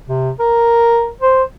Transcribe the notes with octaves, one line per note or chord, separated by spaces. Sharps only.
C3
A#4
C5